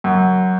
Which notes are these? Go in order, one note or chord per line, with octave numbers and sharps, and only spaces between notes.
F#2